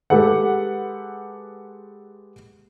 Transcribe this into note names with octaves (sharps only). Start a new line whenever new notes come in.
G#3 G4 A4 B4 F#5